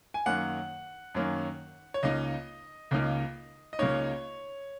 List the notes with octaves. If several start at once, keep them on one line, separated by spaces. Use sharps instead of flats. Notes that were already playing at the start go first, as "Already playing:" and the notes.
G#5
F#2 D#3 A#3 C#4 F#5
F#2 D#3 A#3 C#4
C#5
C#2 C#3 A#3 D#4 D#5
C#2 C#3 A#3 D#4
D#5
C#2 C#3 A#3 D#4 C#5